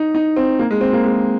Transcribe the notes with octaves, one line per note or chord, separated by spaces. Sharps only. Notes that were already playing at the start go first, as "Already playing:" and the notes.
Already playing: D#4
D#4
C4
A#3
G#3
C4
A#3
G#3